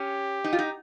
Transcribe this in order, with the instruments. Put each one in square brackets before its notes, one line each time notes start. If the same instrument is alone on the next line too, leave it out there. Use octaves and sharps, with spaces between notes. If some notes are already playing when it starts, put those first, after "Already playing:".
Already playing: [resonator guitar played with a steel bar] C#4 [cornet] G4
[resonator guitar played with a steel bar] D#4
F4
D#4